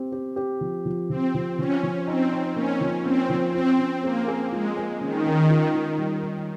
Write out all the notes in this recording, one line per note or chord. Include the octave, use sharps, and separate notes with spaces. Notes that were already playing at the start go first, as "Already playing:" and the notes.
Already playing: C4 G4
G4
G4
F3
F3
F3 C4
F3
F3 C#4
F3
C4 D#4
D#4
A#3 C#4
F3
A#3 C4
F3
C4 F4
C#4
A#3 G#4
G#4
G#3 F4
G#4
D#3 C#4
C#4
F4
F4
G3
G3